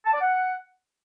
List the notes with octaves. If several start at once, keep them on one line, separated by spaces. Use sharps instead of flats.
A5
D5
F#5